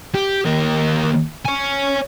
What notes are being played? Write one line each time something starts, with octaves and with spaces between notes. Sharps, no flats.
G4
D#2 A#4
C#5 G#5